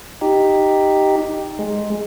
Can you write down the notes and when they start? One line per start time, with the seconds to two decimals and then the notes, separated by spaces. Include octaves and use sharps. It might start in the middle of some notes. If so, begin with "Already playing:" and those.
0.21 D#4 G4
1.59 G#3